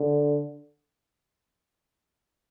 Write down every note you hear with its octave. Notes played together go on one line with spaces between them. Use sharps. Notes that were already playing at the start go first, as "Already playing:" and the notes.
Already playing: D3